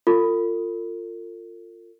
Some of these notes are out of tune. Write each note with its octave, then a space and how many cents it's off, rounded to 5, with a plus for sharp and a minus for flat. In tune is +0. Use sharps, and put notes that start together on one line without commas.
F4 +0 A4 +45